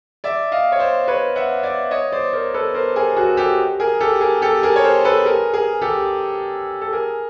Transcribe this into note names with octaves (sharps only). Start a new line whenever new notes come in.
D5 E5
D#5 F5
C#5
C5 D5
B4 C#5
E5 F#5
D5 E5
C#5 D#5
C5 D5
A#4 C5
A4 B4
A#4 C5
G#4 A#4
F#4 G#4
G4 A4
G#4 A#4
G4 A4
G#4 A#4
G4 A4
G#4 A#4
C#5
A#4 C5
A4 B4
G#4 A#4
G#4 A#4
G4 A4
A4
G#4 A#4